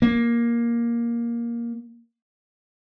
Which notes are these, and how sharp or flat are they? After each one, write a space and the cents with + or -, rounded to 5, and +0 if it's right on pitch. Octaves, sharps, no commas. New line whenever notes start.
A#3 +10